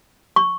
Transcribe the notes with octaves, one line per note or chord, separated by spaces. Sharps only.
C#6